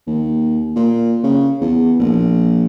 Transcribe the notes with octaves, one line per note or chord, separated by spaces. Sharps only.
D#2
A#2
C#3
E2
A#1